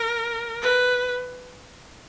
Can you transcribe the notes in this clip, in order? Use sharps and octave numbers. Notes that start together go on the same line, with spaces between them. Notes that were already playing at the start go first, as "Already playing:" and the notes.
Already playing: A#4
B4